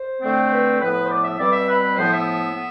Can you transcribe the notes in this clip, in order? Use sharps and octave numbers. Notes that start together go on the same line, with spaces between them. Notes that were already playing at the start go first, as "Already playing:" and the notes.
Already playing: C5
D3 A3 C4
B4
A2 F3 B3 B4
C5
D5
E5
B2 G3 C4 D5
E5
B4
A2 F3 B3 C5
E5
B3